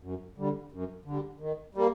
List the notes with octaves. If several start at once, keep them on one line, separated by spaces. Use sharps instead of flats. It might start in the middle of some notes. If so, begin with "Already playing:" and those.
F#2
D3 G3
F#2
D3 G3
D#3
G3 A#3